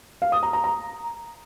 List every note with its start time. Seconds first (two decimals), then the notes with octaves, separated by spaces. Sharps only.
0.22 F5
0.32 D#6
0.43 A#5
0.53 A#5
0.64 A#5